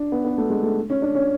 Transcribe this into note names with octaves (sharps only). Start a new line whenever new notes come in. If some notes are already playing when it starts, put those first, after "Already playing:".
Already playing: D4
B3
B3
A3
G#3
A3
C#4
D4
C#4